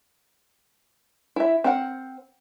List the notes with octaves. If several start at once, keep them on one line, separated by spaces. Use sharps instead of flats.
E4 E5
C4 A#4 F#5